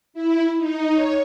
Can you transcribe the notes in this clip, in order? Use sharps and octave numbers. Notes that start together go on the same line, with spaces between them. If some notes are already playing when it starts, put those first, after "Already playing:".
E4
D#4
C#5